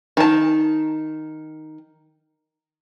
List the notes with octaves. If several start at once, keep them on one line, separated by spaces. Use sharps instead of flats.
D#3 A5